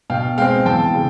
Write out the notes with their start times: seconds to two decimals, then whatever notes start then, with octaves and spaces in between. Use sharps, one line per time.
0.10 B2 F5 G5
0.37 G#3 C4 F5 G5
0.66 E2 G5 A5
0.94 C#3